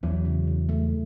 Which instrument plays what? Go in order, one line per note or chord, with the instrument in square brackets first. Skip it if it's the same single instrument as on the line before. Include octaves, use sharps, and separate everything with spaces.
[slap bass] E2 E3 [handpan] F#3
[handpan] C#3
C#3
A3